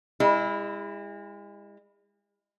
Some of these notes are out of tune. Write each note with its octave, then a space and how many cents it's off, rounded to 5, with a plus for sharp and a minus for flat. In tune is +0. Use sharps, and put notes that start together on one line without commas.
G#3 -40 E4 +0